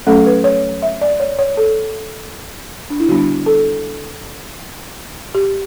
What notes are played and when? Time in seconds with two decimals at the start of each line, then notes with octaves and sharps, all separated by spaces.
0.07 F#3 A3 C#4 A4
0.26 B4
0.44 C#5
0.82 E5
1.01 D5
1.20 C#5
1.39 C#5
1.57 A4
2.90 D4
3.00 E4
3.08 D3 G3 B3 D4 F#4
3.46 A4
5.35 G4